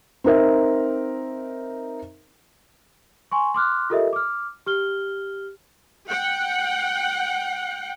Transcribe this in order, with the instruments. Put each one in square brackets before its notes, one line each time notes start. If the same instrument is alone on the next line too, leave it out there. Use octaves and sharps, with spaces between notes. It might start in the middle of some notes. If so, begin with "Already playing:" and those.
[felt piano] C4 D#4 A#4 E5
[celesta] G#5 C6 C#6
C6 D6 F6 F#6
F4 G4 A4 A#4 D#5 E5
D6 F6
G4 F6 G7
[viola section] F#5 G5